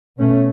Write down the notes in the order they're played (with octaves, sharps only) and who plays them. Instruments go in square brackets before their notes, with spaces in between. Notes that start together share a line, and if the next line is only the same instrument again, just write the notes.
[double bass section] B2 A3 C#4